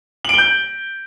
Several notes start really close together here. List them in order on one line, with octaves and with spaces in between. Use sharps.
F#7 D7 G7 G6